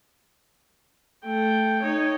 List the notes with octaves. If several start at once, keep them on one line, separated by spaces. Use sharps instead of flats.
A3 G5
D#4 C#5